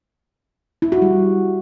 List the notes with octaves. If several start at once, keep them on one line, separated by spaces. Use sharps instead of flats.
E4
F#4
G3